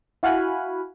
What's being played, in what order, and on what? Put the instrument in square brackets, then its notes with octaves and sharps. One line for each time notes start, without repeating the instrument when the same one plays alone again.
[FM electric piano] E4 F#4 F5 F#5 G#5 B5